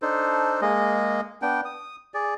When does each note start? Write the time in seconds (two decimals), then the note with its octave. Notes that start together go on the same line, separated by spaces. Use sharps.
0.02 D4 D#4 A4 C5
0.62 G#3 A#3 G#4 D#5
1.42 B3 D4 G5
1.65 D#6
2.14 G#4 D5